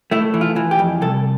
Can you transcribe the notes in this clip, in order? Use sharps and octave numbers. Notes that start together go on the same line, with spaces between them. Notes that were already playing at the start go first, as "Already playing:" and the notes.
A3 E4
E3
F4
E3
G4
F2
C2 A4